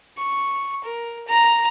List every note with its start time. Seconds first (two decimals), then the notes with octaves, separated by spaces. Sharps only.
0.17 C#6
0.84 A#4
1.28 A#5